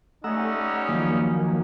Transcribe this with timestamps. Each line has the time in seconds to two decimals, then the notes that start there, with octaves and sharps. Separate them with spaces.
0.24 G3 A3 C#4 D#4 F#5 A#5 E6
0.89 D#3 F3 F#3 A#3